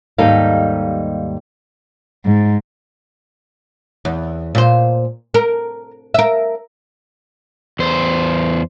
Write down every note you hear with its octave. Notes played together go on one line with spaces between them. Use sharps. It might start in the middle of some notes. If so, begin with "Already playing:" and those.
D#2 G#2 G3 D#4 A4 F5
G#2
E2
A#2 C5
A#4
A#4 E5
E2 C5